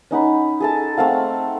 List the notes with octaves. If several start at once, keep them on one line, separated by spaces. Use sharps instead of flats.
C#4 D#4 F#5 B5
G#4 A4 A5
A3 C4 F5 F#5